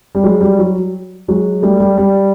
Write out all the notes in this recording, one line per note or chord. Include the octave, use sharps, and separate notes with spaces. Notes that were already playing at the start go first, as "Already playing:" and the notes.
G3
F#3 G#3
G3
F#3
F#3 G#3
G3 A3
G3
G3